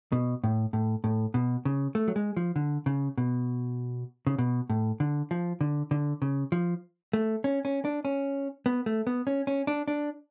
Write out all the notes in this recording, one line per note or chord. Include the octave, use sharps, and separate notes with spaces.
B2
A2
A2
A2
B2
C#3
A3
F#3
G#3
F3
D3
C#3
B2
C#3
B2
A2
D3
F3
D3
D3
C#3
F3
A3
C#4
C#4
D4
C#4
B3
A3
B3
C#4
C#4
D4
D4